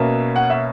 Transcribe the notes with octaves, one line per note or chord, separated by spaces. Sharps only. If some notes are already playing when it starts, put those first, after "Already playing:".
Already playing: B2 A#3 C#4 E5
F#5
E5